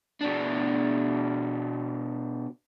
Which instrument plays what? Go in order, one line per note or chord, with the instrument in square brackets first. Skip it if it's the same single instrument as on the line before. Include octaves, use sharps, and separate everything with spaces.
[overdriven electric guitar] B2 D4